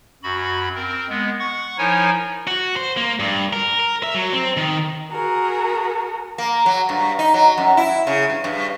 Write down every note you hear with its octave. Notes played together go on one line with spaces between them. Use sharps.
F#2 F#4 B5
C4 A#4
G#3 B3
F#5 C#6
F3 D#4 E4 A#4 C#5 G#5
F#4
C5
A#3
G2
A#4
A#4
E5
F#3
C4
D#3
F#4 G#4 A#4
A#3
F#3
G2
D#4
F#3
F#2
E4
C#3
G2
G2